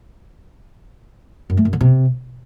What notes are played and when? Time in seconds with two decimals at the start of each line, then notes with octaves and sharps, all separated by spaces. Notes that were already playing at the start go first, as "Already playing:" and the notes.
1.50 F#2
1.57 A3
1.65 F#2
1.73 D3
1.81 C3